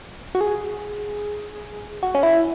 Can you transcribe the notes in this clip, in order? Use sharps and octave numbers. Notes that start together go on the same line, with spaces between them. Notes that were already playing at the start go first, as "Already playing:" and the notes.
F#4
G#4
F#4
C#4
E4